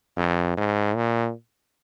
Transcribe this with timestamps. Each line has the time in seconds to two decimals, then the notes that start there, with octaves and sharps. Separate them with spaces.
0.17 F2
0.57 G#2
0.96 A#2